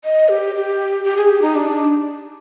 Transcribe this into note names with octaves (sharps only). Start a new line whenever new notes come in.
D#5
G4
G4
G4
G#4
G4
D#4
D4